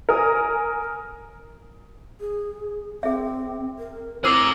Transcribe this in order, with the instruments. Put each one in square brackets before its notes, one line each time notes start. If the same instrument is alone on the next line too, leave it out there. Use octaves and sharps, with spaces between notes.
[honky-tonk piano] A#4 G#5 D#6
[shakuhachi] G#4
[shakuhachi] C4 [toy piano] G#4 E5
[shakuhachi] A#4
[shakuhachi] C4 [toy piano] E4 C5 [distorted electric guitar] G#4 A#5 [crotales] D6 E6 F6